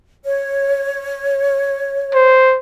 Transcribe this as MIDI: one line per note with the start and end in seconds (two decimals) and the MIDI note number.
0.25 2.33 73
2.14 2.58 72